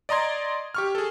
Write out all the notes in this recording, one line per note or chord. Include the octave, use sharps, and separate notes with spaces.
D5 D#5 A#5 C6 G#6
G4 C#6 F6
G#4 A4